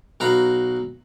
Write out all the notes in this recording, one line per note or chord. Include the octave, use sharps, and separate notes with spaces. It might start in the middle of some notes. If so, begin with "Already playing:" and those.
B1 F#4 F5 A#5 B5